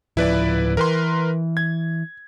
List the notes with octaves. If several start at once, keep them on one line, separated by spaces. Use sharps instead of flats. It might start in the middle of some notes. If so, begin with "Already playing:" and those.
D1 F3 E4 B4 D5
E3 A#4 B4 C6
G#6